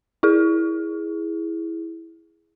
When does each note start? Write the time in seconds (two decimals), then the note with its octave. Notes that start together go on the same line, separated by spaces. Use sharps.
0.23 E4 G#4